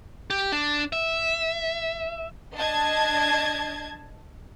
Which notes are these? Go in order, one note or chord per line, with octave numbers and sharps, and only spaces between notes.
G4
D4
E5
D4 D#5 A5 G#6